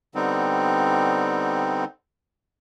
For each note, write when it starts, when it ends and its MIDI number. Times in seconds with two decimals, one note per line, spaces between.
0.15 1.85 50
0.15 1.85 55
0.15 1.85 59
0.15 1.85 60
0.15 1.85 63